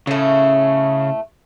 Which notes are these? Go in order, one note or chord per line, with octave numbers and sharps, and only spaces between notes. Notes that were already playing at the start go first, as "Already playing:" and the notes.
A2 C#3 A3